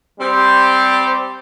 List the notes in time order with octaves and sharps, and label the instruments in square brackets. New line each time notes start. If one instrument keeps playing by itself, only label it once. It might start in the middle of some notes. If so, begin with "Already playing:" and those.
[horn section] G3 C4 G4